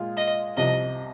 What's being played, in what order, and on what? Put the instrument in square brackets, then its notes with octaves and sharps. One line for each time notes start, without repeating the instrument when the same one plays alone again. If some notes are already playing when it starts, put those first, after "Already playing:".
Already playing: [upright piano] A#2 G#3 F4
[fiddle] D#5
[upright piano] C2 C3 F3 [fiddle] D#5